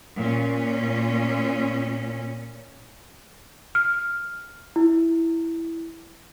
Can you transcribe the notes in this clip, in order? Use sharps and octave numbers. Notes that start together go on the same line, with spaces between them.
A#2 C#4
F6
E4